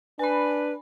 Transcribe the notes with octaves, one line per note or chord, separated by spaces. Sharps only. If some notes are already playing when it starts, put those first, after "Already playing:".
D4 B4 G#5 B5